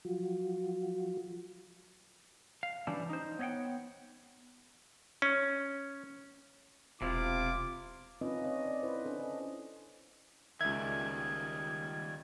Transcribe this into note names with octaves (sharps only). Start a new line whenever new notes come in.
F3 F#3 F4 F#4
F5
E3 G3 C#4 D4 E4
D#4 C5
B3 C#5 D#5 F#5 G5
C#4
E1 C3 E4 F4 D6
C4 C#4 D#4 F4 B4 D#5
C#5 D#5
D5
E4 B4 C5
C#4 D4 A4
D#5
C#2 D#3 G3 E5 G#6